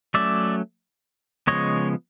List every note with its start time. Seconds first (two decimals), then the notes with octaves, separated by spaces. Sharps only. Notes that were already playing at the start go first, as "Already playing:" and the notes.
0.14 F#3 A3 C#4 D5 E5
1.47 C#3 F3 G#3 B3 C#5 D#5